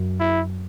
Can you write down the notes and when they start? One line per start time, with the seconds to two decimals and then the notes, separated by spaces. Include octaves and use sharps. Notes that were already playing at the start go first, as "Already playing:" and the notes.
Already playing: F#2
0.20 E4